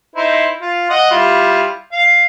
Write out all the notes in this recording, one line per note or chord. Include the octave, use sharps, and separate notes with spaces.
D#4 E4 C5
F4
D#5 F#5
G3 E4 F4
F5